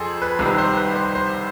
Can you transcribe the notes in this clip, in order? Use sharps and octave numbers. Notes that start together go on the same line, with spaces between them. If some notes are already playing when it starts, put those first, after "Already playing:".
Already playing: F2 G#4 A4 C5
B4
C2 C3 D#3 B4
C5
B4
C5
C5